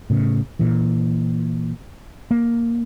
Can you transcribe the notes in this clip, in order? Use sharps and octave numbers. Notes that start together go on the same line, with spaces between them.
A2 C#3
A#2 E3
A#3